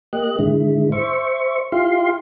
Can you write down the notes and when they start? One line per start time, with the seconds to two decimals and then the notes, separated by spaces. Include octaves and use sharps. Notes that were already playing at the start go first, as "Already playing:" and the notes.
0.13 A#3 G4 D#5 F#6
0.39 G#2 D3 D#3 G#3 E4
0.92 C5 E5 C#6
1.72 E4 F4 G4 F5 C6